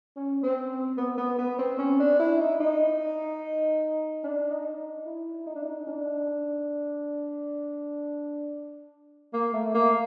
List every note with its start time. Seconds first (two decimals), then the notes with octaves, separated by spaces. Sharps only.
0.16 C#4
0.43 C4
0.97 B3
1.18 B3
1.38 B3
1.59 C4
1.79 C#4
1.99 D4
2.20 E4
2.41 D#4
2.60 D#4
4.24 D4
4.51 D#4
5.06 E4
5.46 D#4
5.55 D4
5.65 D#4
5.87 D4
9.33 A#3
9.54 A3
9.74 A#3